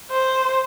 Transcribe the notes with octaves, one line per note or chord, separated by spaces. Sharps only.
C5